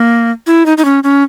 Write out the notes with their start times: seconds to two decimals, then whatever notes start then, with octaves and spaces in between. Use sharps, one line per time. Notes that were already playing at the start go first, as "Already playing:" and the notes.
Already playing: A#3
0.47 E4
0.66 D#4
0.78 D#4
0.85 C#4
1.04 C#4